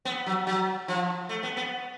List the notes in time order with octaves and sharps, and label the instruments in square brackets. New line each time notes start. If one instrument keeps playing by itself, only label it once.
[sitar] B3
F#3
F#3
F3
A3
B3
B3